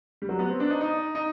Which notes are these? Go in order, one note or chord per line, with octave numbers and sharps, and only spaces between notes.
G3
F#3
B3
C4
D4
D#4
D#4
D#4